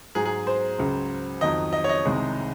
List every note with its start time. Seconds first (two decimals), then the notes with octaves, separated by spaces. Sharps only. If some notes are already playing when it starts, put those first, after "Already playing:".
0.15 G#2 F#3 G#4
0.25 G#4
0.47 C5
0.79 C#2 C#3 F#3
1.41 F2 D#3 F#3 D#5
1.73 D#5
1.84 C#5
1.89 D#5
2.05 C2 C3 D#3 G#3